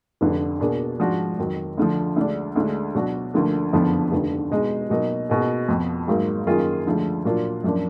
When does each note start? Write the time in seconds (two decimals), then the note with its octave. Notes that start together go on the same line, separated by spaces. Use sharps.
0.21 F1 F2 D3
0.60 B2 A#3 D4 G#4
0.99 G#2 F3 G#3 D4 F#4
1.39 F2 D#3 F#3
1.77 D2 D3 F3
2.16 D2 D3 G#3 D4
2.56 D2 D3 G#3
2.95 B2 F#3 D4 F#4
3.34 D2 D3 F3 A#3
3.73 F#1 F2 D3 F3 B3
4.12 F1 D#2 D3
4.51 B2 G#3 D#4
4.90 B2 F#3 A#3 D#4
5.30 B2 A#3 D#4 G#4
5.68 F2 F3 B3
6.07 G#1 G#2 F#3 A#3
6.47 F#2 D#3 A#3 F4 G#4
6.86 D2 D3 F3 G#3
7.25 A#2 F#3 A#3 D4 F4
7.64 F#2 F3 A#3 D4